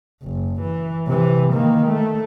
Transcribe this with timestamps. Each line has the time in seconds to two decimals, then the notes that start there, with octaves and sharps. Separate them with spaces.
0.23 F#1
0.61 E3
1.07 C3 E3
1.53 D#3 A#3
1.87 A3